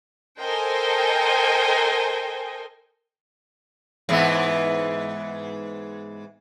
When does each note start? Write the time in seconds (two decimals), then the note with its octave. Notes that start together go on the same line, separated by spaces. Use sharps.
0.40 A4 A#4 C5 D#5 G5 G#5
4.09 G#2 E3 B3